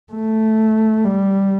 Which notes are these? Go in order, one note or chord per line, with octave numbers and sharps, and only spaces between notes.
A3
G3